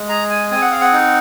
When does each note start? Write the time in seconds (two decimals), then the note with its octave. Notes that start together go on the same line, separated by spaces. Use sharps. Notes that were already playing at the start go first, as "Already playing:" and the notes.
Already playing: G#3
0.09 G#4 A#5
0.30 G#5
0.51 C4 G#5
0.62 F#5
0.71 F5
0.81 F#5
0.93 D#4